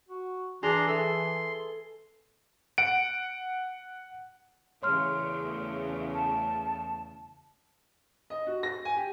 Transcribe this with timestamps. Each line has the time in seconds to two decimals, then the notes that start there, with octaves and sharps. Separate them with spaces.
0.09 F#4
0.63 E3 D4 G#4 A#5 C6
0.87 A4 B4 E5 C6
2.78 F#5 D7
4.83 E2 C#3 A3 C#5 C6 F6
6.13 A5
8.30 D#5
8.47 F#4
8.63 A#6
8.85 G#5
8.97 G4